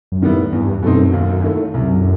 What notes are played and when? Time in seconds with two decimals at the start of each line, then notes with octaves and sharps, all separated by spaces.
0.12 F#2
0.22 D#3 G3 B3 E4
0.32 A2
0.52 E2 G2
0.83 F#2 B2 A3 C4 D#4
1.13 D#2
1.44 D#3 A3 E4
1.74 C2 F#2